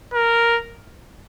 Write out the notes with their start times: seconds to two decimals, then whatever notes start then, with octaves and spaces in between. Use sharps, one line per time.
0.14 A#4